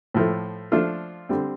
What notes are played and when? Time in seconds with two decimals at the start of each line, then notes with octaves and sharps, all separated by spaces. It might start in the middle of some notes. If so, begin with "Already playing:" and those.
0.14 A2 F3 A3
0.72 F3 A3 D4 F4 A4
1.29 D3 G3 C4